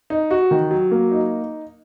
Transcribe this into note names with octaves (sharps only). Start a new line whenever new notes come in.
D#4
F#4
D#3
F#3
A#3
D#4